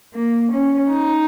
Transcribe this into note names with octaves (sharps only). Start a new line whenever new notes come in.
A#3
C#4
D#4